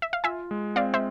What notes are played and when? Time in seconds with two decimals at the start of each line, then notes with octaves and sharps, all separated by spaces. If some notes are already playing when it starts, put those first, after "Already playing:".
0.02 E5
0.13 F5
0.24 F4 E5 G#5
0.51 G#3
0.76 C4 D5 F5
0.94 C5 E5